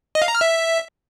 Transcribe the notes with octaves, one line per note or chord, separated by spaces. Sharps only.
D#5
F5
A#5
F6
E5